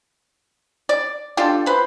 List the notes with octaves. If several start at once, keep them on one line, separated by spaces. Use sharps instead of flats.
D5
D4 F4 G4 A4
B4 C5